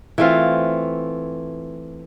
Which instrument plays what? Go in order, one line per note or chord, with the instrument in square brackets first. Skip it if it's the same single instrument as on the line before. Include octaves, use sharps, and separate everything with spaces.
[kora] E3 A3 C4 F4